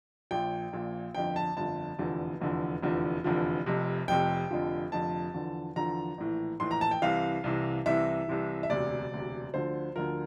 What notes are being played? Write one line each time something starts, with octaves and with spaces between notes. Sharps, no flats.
A#1 A#2 F3 G5
A#1 A#2 F3
G1 F2 D3 F3 G5
A5
G1 F2 D3 F3 A5
F1 E2 D3 F3
F1 E2 D3 F3
F1 E2 D3 F3
F1 E2 D3 F3
F1 F2 C3
F1 F2 C3 G5
F1 F2 D3 F3
F1 F2 D3 F3 A5
E2 D3 F3
E2 D3 F3 A#5
A#1 A2 E3
A#1 A2 E3 C6
A#5
A5
G5
C2 C3 E3 F5
C2 C3 E3
C2 C3 E3 E5
C2 C3 E3
E5
E1 D2 C3 D5
E1 D2 C3
D2 D3 F3 C5
D2 D3 F3 A#4